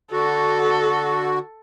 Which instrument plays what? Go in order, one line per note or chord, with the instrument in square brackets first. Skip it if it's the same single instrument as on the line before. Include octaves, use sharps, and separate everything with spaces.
[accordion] D3 F#4 [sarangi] A4